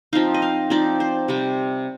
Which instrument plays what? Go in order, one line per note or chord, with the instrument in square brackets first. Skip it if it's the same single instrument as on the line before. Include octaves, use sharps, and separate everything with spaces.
[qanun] F3 C4 D#4 F5
D#5
F5
F3 C4 D#4 D5
C5
C3 G3 C4